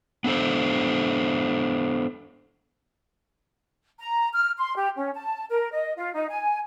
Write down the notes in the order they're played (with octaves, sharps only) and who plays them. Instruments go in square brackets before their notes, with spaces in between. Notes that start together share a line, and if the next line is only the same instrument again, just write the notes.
[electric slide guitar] B3 D4 A4 C5
[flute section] A#5
F6
C6
G4
C#4
A5
A#4
D#5
F4
D#4
G#5